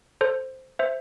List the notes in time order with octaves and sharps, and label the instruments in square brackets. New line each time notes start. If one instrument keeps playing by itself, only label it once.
[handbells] A4 C5
C5 E5